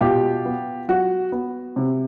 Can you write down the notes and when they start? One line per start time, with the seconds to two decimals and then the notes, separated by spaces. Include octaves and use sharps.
0.01 B2 F4 G4
0.45 B3
0.88 F#3 F#4
1.32 B3
1.76 C3